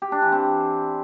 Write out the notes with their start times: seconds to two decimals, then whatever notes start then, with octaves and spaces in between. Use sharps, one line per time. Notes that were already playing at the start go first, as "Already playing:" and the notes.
0.02 G4
0.12 D4
0.22 E3
0.32 C4